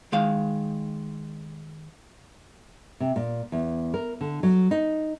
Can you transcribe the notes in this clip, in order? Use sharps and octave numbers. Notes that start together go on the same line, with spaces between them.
D#3 G#3 F5
C3
A#2
E2
A#4
D3
F#3
D#4